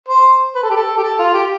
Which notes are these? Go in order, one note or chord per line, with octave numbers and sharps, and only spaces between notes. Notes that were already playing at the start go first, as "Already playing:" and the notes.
C5
B4
A4
G4
A4
G4
A4
F4
G4